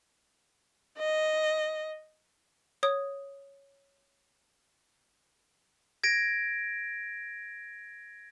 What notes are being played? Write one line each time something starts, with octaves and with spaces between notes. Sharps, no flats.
D#5
C#5 D#6
G#6 A#6 D7